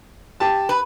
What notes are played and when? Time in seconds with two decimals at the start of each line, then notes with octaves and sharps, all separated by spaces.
0.40 G4 A5
0.69 B4